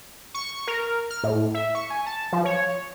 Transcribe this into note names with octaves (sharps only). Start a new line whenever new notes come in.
C#6
A#4
F6
A2
E5
C#6
G#5
A5
F3
C#5